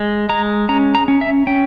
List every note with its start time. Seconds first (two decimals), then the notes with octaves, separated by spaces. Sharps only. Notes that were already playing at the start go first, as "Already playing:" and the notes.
Already playing: G#3
0.29 G#3 A#5
0.69 C#4 A#5
0.95 A#5
1.08 C#4
1.21 E5
1.47 C#4 G5